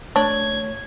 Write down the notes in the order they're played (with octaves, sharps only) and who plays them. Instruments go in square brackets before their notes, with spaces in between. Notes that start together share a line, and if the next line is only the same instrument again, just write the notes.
[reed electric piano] A3 C#5 [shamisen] D4 [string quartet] G#6